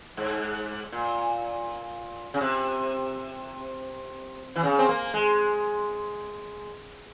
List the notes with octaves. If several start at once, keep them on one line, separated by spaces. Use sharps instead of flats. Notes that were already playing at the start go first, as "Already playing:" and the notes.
G#2
A#2
C#3
C3
E3
C#3
C4
A#3
G#3